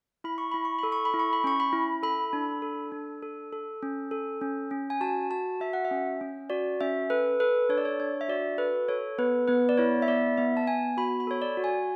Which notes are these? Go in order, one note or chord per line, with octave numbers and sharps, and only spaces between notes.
E4 B5
C#6
E4 B5
C#6
A4 B5
C#6
B5
E4
C#6
B5
C#4 C#6
B5
E4
A4 B5
D4
A4
D4
A4
A4
C#4
A4
C#4
C#4
G#5
F#4 A5
F#4 A5
F#4 E5
F#5
E5
C#4
C#4
F#4 D5
C#4 E5
A4 B4
A4 B4
D4 C#5
D5
C#5
D4 C#5
E5
F#4 D5
A4 B4
A4 C#5
B3 B4
B3 B4
D5
E4 C#5
E5
B3 D5
B3 E5
A5
B3 G#5
F#4 B5
B5
A4 C#5
D5
F#4
G#5